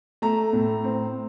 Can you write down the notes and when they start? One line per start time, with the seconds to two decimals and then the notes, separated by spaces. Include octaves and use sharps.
0.22 A3 A#5
0.53 A2
0.84 C4